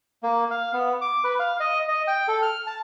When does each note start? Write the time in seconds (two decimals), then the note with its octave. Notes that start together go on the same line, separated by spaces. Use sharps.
0.23 A#3
0.51 F5
0.73 B3
1.01 D6
1.24 B4
1.40 F5
1.60 D#5
1.88 D#5
2.08 G5
2.28 A4
2.42 F6
2.67 A5